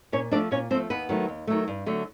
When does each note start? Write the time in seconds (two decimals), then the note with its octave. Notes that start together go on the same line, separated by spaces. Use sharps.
0.12 A#2 C#4 C#5
0.31 F3 A3 D4 D5
0.51 A#2 C#4 C#5
0.70 F3 C4 C5
0.75 A3
0.90 D#2 B3 B4
1.09 D#3 F#3 A3
1.28 D#2
1.47 D#3 F#3 A3
1.68 G2
1.86 D3 F#3 A3